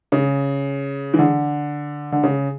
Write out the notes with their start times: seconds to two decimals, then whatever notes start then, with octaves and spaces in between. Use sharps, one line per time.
0.12 C#3
1.14 E3
1.18 D3
2.12 D3
2.23 C#3